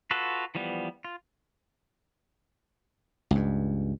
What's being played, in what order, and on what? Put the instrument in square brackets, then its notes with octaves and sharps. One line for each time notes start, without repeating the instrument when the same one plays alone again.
[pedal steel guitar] F4 F#4 A4 B4
E3 F3 G3 B3
F4
[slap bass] C#2 G2